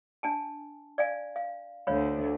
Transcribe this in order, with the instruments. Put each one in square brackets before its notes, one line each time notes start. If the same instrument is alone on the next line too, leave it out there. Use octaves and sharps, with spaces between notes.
[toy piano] D4 G#5 A5
D5 F5 G#5
F5
[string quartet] D2 [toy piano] C#5 F5 B5